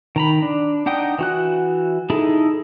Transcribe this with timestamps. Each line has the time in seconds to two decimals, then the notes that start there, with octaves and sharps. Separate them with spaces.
0.16 D#3 A#5 B5
0.42 D4
0.86 D4 D#4 F#5 G5 D#6
1.19 E3 F#4 F#6
2.10 D#4 E4 G#4 A4